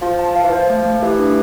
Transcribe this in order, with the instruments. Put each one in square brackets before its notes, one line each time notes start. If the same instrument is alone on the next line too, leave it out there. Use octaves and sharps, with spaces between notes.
[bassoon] F3 [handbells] F4
[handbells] A5
[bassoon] F3 [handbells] F5
[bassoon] E3
[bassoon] F3 [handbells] C5
[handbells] A3
A3
[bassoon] E3 [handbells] G4
[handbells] D4